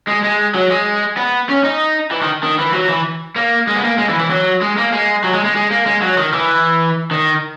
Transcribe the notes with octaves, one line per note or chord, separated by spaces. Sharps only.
G#3
G#3
F#3
G#3
B3
C#4
D#4
E3
D#3
D#3
E3
F#3
E3
A#3
G#3
B3
A#3
G#3
E3
E3
F#3
G#3
A#3
G#3
F#3
G#3
G#3
G#3
A#3
G#3
F#3
D#3
E3
D#3